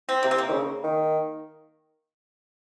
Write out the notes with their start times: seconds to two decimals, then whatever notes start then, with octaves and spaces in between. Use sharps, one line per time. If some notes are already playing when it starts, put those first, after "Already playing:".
0.09 C4
0.23 C3 A#3
0.31 C4
0.38 A#3
0.48 D#3
0.52 C#3
0.83 D#3